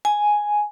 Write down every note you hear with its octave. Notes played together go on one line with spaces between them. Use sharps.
G#5